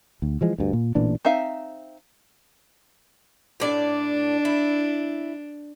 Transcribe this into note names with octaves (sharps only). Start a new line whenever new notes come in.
D2
E3 F3 G#3
D2 G2
A#2
A1 A#2 E3 D4
C4 D#4 E5 F5
A2 D4 D5
E4